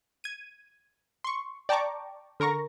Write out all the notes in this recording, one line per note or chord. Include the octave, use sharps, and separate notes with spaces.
G#6 D#7
C6 C#6
D5 G5 A5 A#5 C#6 D6
D3 A#4 A#5 C#6 A#6